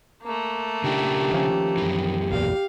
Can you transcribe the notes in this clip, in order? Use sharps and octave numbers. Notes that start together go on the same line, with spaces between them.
A3 A#3
C#3 D4 E4 G4
D#3 F3 C#4
F#2 E3
B1 E2 A#2 F5